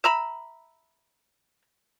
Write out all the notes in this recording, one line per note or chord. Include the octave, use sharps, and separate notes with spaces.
E5 A#5 B5